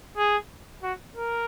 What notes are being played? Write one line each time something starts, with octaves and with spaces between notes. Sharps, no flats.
G#4
F#4
A#4